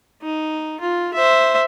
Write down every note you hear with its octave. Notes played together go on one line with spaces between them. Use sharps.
D#4
F4
C5 E5